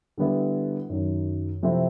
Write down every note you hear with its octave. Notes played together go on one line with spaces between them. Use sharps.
D3 G3 B3 E4
F#2 D#3 F#3
C3 F3 A3 C4 E4